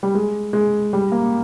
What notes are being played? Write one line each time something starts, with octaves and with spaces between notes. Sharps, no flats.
G3
G#3
G#3
G3
A#3